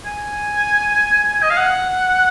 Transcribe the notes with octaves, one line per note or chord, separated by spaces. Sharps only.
G#5
D#5
F5
F#5